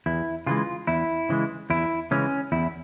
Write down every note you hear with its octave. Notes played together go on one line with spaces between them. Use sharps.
E2 E4
C#3 E3 G#3 F4
E2 E4
C#3 E3 G#3
E2 E4
C#3 E3 G#3 C#4
E2 E4